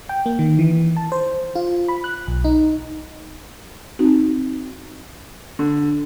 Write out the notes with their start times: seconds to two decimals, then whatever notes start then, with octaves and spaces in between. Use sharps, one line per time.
0.09 G5
0.26 A#3
0.39 D#3
0.59 E3
0.97 A5
1.12 C5
1.55 F4
1.88 B5
2.04 F#6
2.27 B1
2.45 D#4
3.99 C4 D#4 F#4
5.59 D3